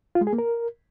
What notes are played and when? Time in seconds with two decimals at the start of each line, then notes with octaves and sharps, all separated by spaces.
0.15 F4
0.21 G#3
0.27 G#4
0.33 A#3
0.38 A#4